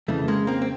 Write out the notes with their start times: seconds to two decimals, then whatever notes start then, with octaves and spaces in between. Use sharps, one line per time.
0.08 F2 C#3 E3 A3
0.28 G#3 A#3
0.47 A#3 C4
0.62 C4